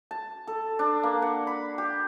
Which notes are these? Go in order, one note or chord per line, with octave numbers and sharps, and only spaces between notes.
A5
A4
D4
A#3
F#5
B5
G4